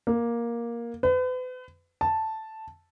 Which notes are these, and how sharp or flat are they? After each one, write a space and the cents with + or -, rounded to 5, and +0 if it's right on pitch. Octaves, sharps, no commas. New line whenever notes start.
A#3 +10
B4 +40
A5 +0